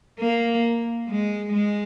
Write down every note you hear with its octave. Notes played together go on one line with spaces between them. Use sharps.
A#3
G#3
G#3